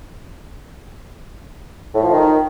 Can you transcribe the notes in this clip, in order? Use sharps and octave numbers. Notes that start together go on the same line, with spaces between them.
A2
F3
D#3